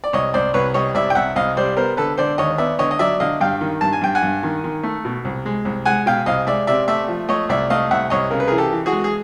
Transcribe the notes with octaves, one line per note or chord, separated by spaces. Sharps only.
D5
C2 C#5 D#5
C2 C5 D5
C2 B4 C#5
G3 C#5 D#5
C2 D5 E5
G5
C2 E5 F#5
C2 D#5 F5
G3 C5 D5
B3 A#4 C5
D3 A4 B4
D3 C5 D5
D#2 C#5 D#5
B3 D5 E5
D3 C#5 D#5
D#5
F#3 D5 E5
D3 D#5 F5
G2 F5 G5
D#3
G2 A5
G#5
G2 G5
F#5 G#5
G2
D#3
D#3
A3
B2
C2
G#3
C2
G#3 F#5 G#5
B2 F5 G5
C2 D#5 F5
G#3 D5 E5
C3 D5 E5
A3 D5 E5
F3
A3 C#5 D#5
C2 D5 E5
A3 D#5 F5
C2 E5 F#5
C2 C#5 D#5
C#3 A#4
B4
G#4 A#4
E3
G4 A4
E3
F#4 G#4
G#3
G#4